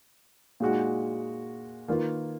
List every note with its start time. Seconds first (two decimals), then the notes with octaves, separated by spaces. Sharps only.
0.60 A#2 G#3 D#4 F#4
1.88 D#3 A#3 F4 B4